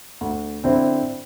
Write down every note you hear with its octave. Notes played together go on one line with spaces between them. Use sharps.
D2
D3 C4 E4 C5